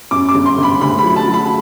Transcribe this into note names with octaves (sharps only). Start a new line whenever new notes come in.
F#2 D6
D6
G1
C6
G1
B5
D2 B5
B5
F#3
A5
F#3
B5